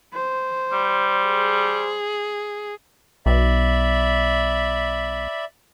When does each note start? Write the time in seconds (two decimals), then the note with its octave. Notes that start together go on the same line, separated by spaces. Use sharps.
0.14 C5
0.73 G3
1.27 G#4
3.26 B1 D5 E5 B5